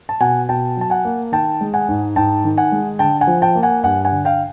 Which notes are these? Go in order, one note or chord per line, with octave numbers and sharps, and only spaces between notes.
A5
B2 F#5 G#5
B2 G5 A5
F#3 A5
F#5 G#5
A#3
D#3 G5 A5
G#3
F#5 G#5
G#2
G#2 G5 A5
D#3
F#5 G#5
G#3
D3 G5 A5
F#5 G#5
F3
G5 A5
A#3
F#5 G#5
G2 F#5 G#5
F#5 G#5
D3
F5 G5